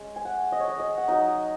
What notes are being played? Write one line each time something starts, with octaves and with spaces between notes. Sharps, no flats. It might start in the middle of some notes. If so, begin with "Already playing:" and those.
Already playing: G#3 C#4
G#5
F#5
D#5
C#5
D#5
D#5
F#5
F#3 D#4 D#5